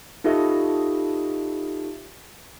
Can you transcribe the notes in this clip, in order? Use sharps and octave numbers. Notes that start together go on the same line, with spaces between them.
D#4 F4 G4 A4 D#5 E5